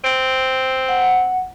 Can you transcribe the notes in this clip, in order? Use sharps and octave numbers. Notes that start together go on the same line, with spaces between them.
C4
F#5